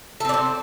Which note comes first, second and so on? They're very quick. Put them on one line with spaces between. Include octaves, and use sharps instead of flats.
A4 C4 D4 C5